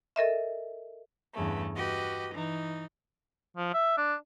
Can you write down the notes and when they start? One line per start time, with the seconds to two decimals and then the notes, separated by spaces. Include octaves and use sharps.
0.16 A4 A#4 D#5 E5
1.34 E2 G2 C#3 A3
1.76 F#4 G4 B4 D#5
2.33 E3 D#4
3.57 F3
3.74 E5
3.97 D4